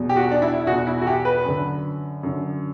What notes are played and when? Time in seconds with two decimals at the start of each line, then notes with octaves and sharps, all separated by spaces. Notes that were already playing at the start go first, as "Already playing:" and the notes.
Already playing: E2 B2
0.09 G4
0.16 F#4
0.32 D4
0.42 E4
0.67 E2 B2 F#4
0.87 E4
1.02 F#4
1.07 G4
1.25 B4
1.45 F#2 D3
2.23 F#2 D3